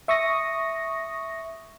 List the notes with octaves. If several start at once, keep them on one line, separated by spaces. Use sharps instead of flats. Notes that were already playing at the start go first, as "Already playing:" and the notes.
E5 C#6 D#6 A#6